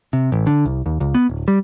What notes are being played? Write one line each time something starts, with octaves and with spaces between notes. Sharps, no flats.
C3
A1
D3
C2
D#2
C#2
B3
D1
G3